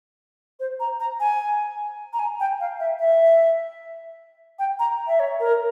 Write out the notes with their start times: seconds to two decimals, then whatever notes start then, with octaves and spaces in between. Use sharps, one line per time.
0.60 C5
0.80 A#5
1.00 A#5
1.20 G#5
2.13 A#5
2.19 G#5
2.40 G5
2.60 F5
2.80 E5
2.99 E5
4.59 G5
4.79 A#5
5.07 E5
5.20 C#5
5.40 A#4